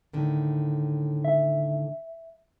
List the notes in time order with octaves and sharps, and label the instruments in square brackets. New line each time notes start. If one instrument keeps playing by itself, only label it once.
[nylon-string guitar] A2 D3 D#3
[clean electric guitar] E5